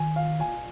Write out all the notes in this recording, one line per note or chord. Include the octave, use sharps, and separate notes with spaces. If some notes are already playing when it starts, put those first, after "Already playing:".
Already playing: D#3 G#5
F5
G#5